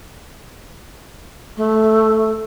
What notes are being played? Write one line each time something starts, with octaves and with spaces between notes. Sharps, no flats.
A3